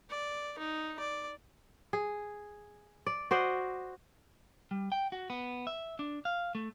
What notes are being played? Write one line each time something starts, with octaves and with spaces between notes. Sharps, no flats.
D5
D#4
D5
G#4
D5
F#4 C5 D5 D#5
G3
G5
F#4
B3
E5
D4
F5
A3